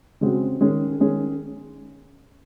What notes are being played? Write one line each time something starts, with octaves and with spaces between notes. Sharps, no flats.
C#3 G#3 C4 F#4
D#3 G#3 C#4 G#4
D#3 G#3 C#4 G#4